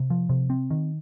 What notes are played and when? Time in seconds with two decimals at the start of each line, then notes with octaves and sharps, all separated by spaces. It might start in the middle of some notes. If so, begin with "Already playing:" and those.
Already playing: C3
0.10 F3
0.29 C3
0.50 C4
0.71 D#3